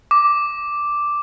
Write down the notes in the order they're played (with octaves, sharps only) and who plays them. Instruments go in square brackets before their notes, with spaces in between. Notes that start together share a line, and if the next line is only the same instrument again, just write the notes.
[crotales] D6